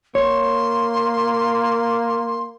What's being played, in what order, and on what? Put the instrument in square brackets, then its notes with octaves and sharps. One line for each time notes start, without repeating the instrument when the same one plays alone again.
[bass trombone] A#3 [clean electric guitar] C#5 [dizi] C6